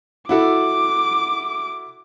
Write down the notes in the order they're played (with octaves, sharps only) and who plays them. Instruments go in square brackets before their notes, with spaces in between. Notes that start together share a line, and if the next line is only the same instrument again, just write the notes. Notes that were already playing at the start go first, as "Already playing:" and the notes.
[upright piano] E4 F#4 A4 [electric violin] D6